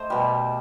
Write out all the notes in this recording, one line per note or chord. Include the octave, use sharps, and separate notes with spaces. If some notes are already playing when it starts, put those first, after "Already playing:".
Already playing: A3 C5 D#5
B2 G3